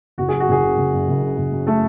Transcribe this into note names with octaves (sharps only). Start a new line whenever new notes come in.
F#1 F#4
G#4
F#2
F#4
F#1 G#4
C#3
F#1
F#2
F#1
C#3
F#1
F#2
A3 A4